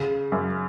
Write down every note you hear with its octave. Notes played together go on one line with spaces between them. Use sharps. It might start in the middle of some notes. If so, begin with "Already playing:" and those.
Already playing: C#3
F#2